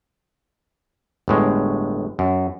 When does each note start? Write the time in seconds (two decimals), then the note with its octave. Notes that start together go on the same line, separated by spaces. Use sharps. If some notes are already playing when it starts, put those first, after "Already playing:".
1.28 G1 A2 G#3
2.19 F#2